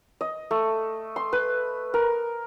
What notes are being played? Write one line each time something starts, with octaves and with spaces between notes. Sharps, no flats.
D#5
A3
C6
B4
A#4